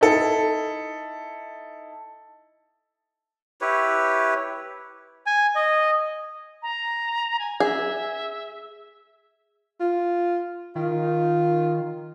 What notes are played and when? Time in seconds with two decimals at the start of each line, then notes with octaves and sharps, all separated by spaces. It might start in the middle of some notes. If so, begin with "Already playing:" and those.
0.01 D#4 E4 A4
3.61 E4 G4 B4 C#5
5.26 G#5
5.55 D#5
6.63 A#5
7.39 G#5
7.60 G#4 E5
9.80 F4
10.75 D#3 F4